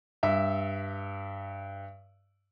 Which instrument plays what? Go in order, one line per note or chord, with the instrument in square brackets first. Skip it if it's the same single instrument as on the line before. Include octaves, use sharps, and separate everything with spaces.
[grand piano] G2 E5